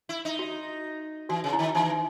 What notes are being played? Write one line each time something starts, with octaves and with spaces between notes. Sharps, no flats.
E4
D#4
F#4
E3 F#4
C#3
E4
D#3
E3 D#4